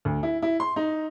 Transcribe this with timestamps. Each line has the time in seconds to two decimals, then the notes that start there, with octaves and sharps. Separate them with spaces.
0.05 D2
0.23 E4
0.42 E4
0.60 C6
0.76 D#4